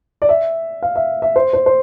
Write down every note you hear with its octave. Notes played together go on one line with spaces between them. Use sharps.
D5
E5
F5
E5
E5
C5
C5
C5